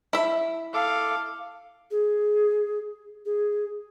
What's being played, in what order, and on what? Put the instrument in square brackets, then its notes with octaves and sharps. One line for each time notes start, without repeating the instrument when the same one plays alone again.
[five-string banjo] E4 E5
[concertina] A4 D6 [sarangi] F5
[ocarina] G#4
G#4